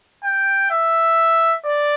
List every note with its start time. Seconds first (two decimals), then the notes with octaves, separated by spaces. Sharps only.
0.24 G5
0.71 E5
1.65 D5